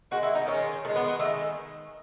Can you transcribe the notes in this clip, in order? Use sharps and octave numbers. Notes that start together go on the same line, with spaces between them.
D#3 G#3 F#4
E4
D#4
D#3 G#3 C#4
D#3 G#3 A3
B3
B3
D#3 G#3 A3